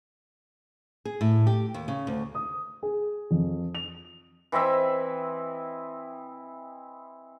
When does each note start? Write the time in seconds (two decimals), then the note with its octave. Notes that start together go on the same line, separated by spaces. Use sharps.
1.05 G#4
1.21 A2
1.47 G4
1.74 D#2
1.88 C#3
2.07 D2
2.35 D#6
2.83 G#4
3.31 F2
3.75 F7
4.52 E3 C4 D#5 E5